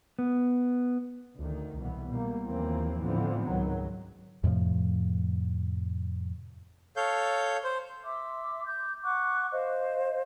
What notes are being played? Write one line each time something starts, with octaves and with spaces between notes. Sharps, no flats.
B3
D2 D#3
C2 B2 E3 B3
B2 G3 A#3
D#2 E3 F3 A#3 C4
A2 D3 E3 F3 B3 C4
C#2 G#2 D#3 F#3
F2 A2 C3 F3
A4 C#5 F5 G6
C5
E5 C6 D6 E6
D6 G6
F#5 C#6 D6 F#6
C5 D#5 F5